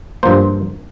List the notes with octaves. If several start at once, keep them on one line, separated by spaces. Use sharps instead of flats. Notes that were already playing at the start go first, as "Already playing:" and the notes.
G2 F3 A#3 C5